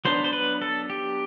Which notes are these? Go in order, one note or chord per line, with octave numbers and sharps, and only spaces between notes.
F#3 B3 D4 C5
C5
B4
A4
G4